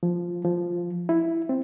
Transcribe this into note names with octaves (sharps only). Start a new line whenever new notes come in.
F3
F3
E4
C4